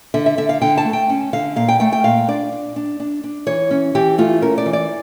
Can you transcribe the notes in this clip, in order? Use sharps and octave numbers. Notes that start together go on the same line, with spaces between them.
D3 E5
E5
D3 E5
F5
D3 G5
A5
A3
G5
C#4
D3 F5
A#2 F5
G5
A3 G5
G5
A#2 F5
D4 D5
D4
D4
D4
D4
E3 C#5
C#4
E3 G4
A3 F4
C#4 A#4
D5
E3
D5